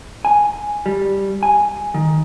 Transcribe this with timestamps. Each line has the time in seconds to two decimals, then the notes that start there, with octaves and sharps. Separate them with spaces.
0.25 G#5
0.86 G3
1.43 G#5
1.94 D#3